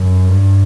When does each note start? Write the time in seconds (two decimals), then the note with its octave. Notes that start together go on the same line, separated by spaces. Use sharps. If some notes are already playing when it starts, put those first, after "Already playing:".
Already playing: F#2
0.28 G2